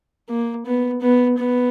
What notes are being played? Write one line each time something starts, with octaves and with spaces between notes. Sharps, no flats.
A#3
B3
B3
B3